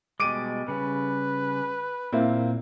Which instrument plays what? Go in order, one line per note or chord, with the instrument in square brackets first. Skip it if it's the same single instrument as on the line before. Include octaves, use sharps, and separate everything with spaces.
[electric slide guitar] B2 G3 G#3 [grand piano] D6 D7 D#7
[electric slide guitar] C#3 G3 [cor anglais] B4
[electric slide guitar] A#2 [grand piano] A#3 C4 E4